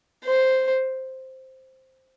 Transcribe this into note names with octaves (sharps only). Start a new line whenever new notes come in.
C5